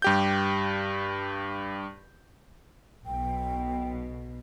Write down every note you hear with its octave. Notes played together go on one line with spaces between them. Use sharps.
G2 G4 G6
B1 B2 G5